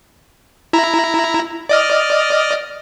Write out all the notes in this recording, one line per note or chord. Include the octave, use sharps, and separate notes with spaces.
E4 A#5
D5 D#5 F6